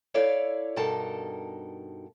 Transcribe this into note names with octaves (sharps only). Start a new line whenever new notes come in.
E4 A4 C#5 D5 E5 F5
G2 B2 D#4 A4 A#4 A5